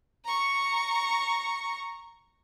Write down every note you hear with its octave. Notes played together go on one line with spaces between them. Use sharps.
A#5 C#6